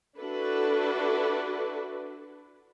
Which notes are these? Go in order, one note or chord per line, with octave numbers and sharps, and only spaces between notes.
D4 E4 F#4 A4 B4